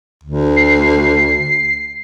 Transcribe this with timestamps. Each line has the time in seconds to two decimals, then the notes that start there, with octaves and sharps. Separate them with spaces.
0.24 D2
0.56 C7